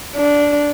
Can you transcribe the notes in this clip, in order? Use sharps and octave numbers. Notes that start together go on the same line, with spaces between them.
D4